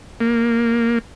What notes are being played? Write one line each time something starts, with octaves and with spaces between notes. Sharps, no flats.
A#3